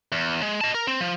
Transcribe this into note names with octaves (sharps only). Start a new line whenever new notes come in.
E2
G#3
D#5 A5
A#4
C4
F3